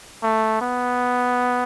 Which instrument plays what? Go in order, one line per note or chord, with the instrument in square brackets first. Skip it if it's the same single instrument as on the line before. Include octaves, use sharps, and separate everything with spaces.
[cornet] A3
B3